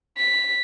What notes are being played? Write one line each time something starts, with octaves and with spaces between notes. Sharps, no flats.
B6